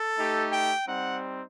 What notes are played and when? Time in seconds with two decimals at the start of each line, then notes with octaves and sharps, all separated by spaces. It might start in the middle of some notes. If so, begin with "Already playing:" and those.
Already playing: A4
0.18 A3 D#4 G4
0.53 G5
0.88 G3 C4 D#4 F#5